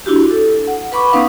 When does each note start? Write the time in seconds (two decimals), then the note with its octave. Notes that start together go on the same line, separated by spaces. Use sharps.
0.06 D4 E4 F#4 G4
0.31 A4
0.67 F#5
0.92 B4 F#5 B5 C#6 D6
1.12 B3 C#4 D#4 B4 F5 F#5